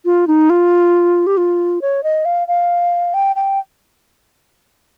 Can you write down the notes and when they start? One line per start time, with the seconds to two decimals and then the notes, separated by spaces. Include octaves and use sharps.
0.05 F4
0.27 D#4
0.50 F4
1.27 G4
1.37 F4
1.82 C#5
2.03 D#5
2.25 F5
2.48 F5
3.14 G5
3.36 G5